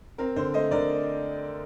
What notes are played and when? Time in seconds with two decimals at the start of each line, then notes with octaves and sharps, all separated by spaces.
0.18 C4 A#4
0.36 D3 C5
0.54 A3 C5 D#5
0.71 D3 A#4 D5